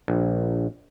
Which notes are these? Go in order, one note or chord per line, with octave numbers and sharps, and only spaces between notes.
A#1